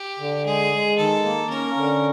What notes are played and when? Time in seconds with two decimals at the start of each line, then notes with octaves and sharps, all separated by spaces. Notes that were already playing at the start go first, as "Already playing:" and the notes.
Already playing: G4
0.19 D3
0.45 G#3 G#4
0.72 G#3
0.97 D#3 A4
1.24 A#3
1.49 C#4 A#4
1.76 D3